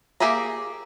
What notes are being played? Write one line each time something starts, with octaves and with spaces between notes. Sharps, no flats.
A#3 G4 G#4 E5 A#5